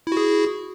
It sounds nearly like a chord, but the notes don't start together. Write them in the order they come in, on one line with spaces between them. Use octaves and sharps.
E4 F#4 G#4